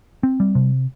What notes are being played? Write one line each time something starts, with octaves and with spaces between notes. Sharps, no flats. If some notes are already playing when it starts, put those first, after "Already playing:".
C4
G3
C3